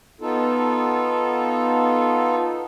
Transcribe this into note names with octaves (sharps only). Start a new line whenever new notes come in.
B3 D#4 F4 A4